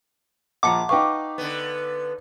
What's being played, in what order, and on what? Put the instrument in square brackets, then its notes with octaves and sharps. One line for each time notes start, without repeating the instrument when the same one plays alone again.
[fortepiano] A#1 F3 A#5 [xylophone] F#5 A5 C#7 [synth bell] D6
[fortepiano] D#4 B4 F5 [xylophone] G5 C#6
[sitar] D3 B3